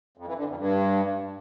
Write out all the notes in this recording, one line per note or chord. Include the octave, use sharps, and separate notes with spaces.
F2
E3
D3
F2
G2